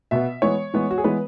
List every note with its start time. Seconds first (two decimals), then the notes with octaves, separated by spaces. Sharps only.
0.11 B2 B3 E5
0.42 E3 G#3 B3 C#5
0.74 E3 G#3 B3
0.91 F#4
0.98 G#4
1.04 E3 G#3 B3 B4